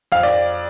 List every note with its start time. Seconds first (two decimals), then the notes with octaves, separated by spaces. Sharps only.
0.12 F2 F5
0.23 D5